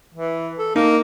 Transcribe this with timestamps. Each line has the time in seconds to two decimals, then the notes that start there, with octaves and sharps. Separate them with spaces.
0.14 E3
0.59 A4
0.76 A#3 D#4